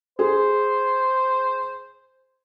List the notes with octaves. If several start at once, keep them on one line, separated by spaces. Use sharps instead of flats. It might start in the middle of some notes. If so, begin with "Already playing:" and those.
G#4 C5